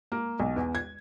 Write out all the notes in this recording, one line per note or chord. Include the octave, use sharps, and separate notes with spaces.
A#3
B1
E2
G#6